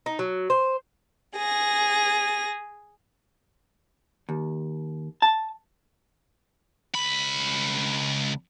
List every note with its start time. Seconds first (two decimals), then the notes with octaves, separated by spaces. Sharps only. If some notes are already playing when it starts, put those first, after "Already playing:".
0.06 D#4
0.19 F#3
0.50 C5
1.35 G#4 A#6
4.29 D#2
5.22 A5
6.95 C#2 B5